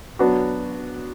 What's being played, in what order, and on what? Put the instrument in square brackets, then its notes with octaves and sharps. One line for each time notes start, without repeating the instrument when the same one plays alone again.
[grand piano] F#3 B3 D4 F#4